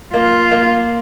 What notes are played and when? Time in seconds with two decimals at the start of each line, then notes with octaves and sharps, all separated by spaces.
0.14 A#3 F4
0.51 A#3